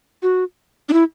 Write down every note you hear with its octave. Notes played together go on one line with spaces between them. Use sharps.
F#4
D4
E4